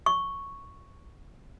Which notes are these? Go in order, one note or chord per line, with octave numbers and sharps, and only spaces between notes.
C#6